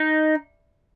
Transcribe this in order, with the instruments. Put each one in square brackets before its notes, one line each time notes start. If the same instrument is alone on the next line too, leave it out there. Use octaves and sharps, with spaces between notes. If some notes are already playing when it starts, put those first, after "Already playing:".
Already playing: [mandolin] D#4